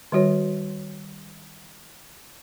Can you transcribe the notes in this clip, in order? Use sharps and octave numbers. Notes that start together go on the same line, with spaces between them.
D#3 G3 F#4 C#5